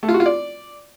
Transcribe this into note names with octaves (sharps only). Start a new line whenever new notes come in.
A3
F4
F#4
F4
D5